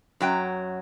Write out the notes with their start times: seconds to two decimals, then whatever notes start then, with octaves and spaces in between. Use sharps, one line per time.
0.20 F#2 F#3 G5